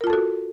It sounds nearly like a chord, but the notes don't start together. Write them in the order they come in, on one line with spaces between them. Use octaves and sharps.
A#4 F4 A5 A4 F#4